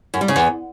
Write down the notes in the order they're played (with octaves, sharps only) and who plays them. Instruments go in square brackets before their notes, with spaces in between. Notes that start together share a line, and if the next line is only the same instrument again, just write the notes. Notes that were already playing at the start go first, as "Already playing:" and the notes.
[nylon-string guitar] F#2
G3
C#3
E2